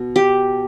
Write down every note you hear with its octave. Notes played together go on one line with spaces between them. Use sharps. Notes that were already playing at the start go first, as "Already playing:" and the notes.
Already playing: B2
G4